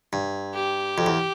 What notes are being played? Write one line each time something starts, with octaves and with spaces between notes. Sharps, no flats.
G2
G4
F2
E2